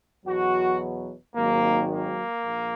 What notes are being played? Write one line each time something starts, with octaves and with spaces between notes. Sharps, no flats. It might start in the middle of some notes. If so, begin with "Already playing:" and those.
E2 B2 F#3 F#4
G#1 G#2 D#3 F#3 A#3
A#3
A#1